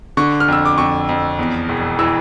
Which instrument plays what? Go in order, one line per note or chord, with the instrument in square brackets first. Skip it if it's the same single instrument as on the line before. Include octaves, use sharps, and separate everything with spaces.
[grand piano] D3 C#6
F6
F2 E6
D6
F2 C#6
F2
E2
E1
E3 E6